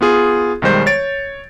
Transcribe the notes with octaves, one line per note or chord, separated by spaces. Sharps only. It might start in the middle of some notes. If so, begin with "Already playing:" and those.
B3 F4 G#4
B1 D#3 G3 G#3 C5 G6
C#5 A6 D7